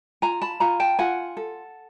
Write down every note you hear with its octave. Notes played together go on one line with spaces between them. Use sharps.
F4 G#5 A#5
A5 B5
F4 G#5 A#5
G5 A5
F4 F#5 G#5
A4